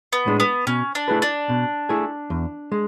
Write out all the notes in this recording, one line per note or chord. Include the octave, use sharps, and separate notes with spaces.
B3
A2 G#3 D4
B3
B2 C#4
D4
A3 E4 G#4 B4
D4
B2
A3 E4 G#4
E2
G#3